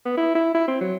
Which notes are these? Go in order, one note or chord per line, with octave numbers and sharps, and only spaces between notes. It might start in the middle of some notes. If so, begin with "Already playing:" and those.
B3
E4
E4
E4
C4
F#3